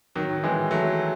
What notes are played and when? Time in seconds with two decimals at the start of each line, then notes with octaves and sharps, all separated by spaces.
0.15 D#3 F#3
0.44 E3 G#3
0.71 F#3 A3